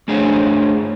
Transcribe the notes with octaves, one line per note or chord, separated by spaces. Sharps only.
A3 D4 G#4 C5 C#5